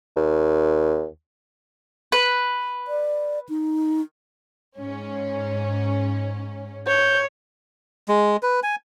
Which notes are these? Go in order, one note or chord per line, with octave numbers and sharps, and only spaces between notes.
D#2
B4
D5
D#4
G#2 C#4
C#5 G6
G#3
B4
G#5